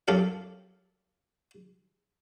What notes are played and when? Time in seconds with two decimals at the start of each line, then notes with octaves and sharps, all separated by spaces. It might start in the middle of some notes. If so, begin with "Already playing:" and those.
0.08 F#2 G4 A4 F5